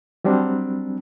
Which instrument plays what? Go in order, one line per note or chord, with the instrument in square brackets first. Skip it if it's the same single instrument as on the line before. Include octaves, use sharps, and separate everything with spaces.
[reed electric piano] F#3 G3 C4 D4